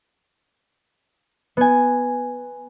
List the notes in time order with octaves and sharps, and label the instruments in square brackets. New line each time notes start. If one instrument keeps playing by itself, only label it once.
[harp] B3 G#5